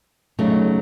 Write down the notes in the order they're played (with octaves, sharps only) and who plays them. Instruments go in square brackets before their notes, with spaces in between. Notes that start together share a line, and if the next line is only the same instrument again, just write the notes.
[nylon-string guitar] C#3 F#3 A3 D#4